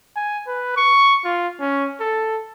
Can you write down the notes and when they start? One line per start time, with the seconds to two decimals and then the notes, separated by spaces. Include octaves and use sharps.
0.16 G#5
0.47 B4
0.77 C#6
1.24 F4
1.60 C#4
2.01 A4